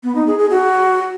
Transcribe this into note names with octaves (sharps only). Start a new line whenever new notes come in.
B3
D#4
G#4
G#4
F#4